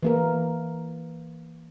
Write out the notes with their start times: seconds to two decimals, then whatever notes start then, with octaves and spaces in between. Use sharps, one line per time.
0.03 E3 A#3 A#4